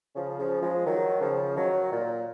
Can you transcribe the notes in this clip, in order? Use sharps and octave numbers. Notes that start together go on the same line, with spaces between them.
C#3 F3
C#3 F3
F3 G#3
D#3 F#3
C#3 F3
D#3 F#3
A#2